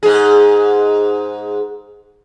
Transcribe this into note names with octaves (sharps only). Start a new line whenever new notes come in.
G#2 G#4